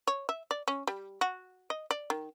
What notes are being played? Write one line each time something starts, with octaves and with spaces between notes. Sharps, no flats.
C#5
E5
D5
C#4
G3
F#4
D#5
D5
D#3